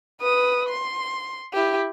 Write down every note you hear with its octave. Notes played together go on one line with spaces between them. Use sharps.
B4 D#6
C6
E4 G4